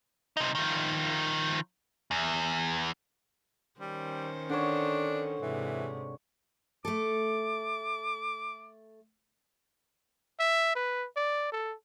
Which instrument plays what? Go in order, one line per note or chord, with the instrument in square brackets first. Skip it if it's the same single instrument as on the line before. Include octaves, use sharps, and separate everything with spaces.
[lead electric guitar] C3 D#4
D#3 F3
E2
[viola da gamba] D#3 C#4 C5 [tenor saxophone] G3
[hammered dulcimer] D3 C#5 [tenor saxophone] D4
[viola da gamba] G#2 C3 [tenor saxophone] E3
[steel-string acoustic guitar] A3 A4 [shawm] D6
[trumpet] E5
B4
D5
A4